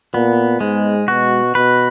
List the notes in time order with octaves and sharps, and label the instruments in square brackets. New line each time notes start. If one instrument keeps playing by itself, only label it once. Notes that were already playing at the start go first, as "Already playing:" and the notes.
[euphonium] A#2 [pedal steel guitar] B3
[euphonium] G#2 [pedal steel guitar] G#3
[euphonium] B2 [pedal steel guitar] F#4
[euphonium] B2 [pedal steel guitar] B4